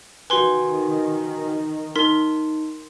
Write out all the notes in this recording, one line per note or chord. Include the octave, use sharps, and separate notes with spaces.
D#3 F#4 B4 G#5 C6
D#4 A#4 C6 B6